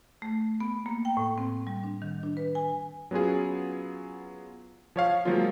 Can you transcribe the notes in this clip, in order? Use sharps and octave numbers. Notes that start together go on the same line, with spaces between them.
A3
B3
A#3
G5
A2
C4
G3
D4
D#3
D4
B4
G#5
F#3 B3 C#4 F4 G#4
F3 C#5 F5
D#3 F3 F#3 G#3 A#3 F4